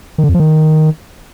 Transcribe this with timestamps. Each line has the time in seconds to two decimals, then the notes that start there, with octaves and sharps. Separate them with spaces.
0.18 D#3
0.24 D3
0.29 F2
0.34 F3
0.40 D#3